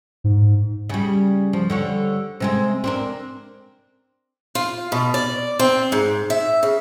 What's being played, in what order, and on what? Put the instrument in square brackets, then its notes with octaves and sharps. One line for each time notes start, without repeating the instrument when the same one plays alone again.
[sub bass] G#2
[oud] C#3 G3
F3
D3 G3 C#5
C3 G#3 C4
C4 D4 A#4
[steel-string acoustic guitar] F4
B2
D5
C4
G#2
E5
C#3